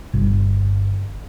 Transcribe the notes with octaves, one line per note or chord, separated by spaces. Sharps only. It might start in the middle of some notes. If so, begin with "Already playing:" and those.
G1